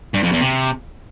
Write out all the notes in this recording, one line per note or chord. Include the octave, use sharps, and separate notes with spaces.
G2
F2
E2
C3